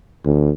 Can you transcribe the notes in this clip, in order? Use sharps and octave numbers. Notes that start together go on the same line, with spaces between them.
D2